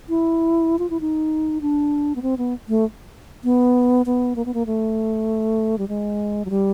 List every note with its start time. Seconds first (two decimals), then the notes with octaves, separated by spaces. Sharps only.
0.09 E4
0.79 F4
0.90 E4
1.01 D#4
1.61 D4
2.16 B3
2.22 C4
2.38 B3
2.68 A3
3.44 B3
4.06 B3
4.36 A#3
4.46 B3
4.54 A#3
4.66 A3
5.78 G3
5.88 G#3
6.45 F#3
6.50 G3